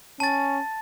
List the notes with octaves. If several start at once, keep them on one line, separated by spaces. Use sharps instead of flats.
C#4 A5 A6